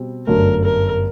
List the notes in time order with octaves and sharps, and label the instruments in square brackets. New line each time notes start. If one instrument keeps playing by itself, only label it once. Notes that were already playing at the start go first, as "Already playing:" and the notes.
Already playing: [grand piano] B2 G3 C4
[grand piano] G1 F#2 D3 F#3 A3 [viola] A#4
[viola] A#4